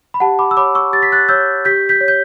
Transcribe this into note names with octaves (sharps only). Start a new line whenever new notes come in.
B5
G4 F#5 A5
B5 D6
E6
C#5 B5 D6
C#6 E6
G4 A6
B6
F#6 A6
C#5 E6 G6
G4 G6 B6
G6 B6
C#5
G6